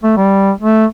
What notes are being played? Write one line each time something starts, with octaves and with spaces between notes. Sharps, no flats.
A3
G3
A3